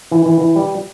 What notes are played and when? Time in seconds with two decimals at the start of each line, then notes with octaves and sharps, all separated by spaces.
0.11 E3
0.26 E3
0.41 E3
0.56 G3